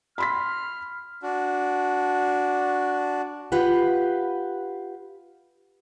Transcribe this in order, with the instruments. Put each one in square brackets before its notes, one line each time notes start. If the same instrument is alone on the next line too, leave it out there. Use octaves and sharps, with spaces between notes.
[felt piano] B5 C6 B6 [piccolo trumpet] F6
[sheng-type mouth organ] D4 F#4
[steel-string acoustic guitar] F4 G4 B4 F#5